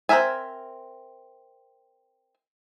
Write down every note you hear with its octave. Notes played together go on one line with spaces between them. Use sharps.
C4 D4 A#4 E5 G#5